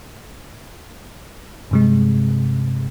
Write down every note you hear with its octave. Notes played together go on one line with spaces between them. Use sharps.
G2 C3 G#3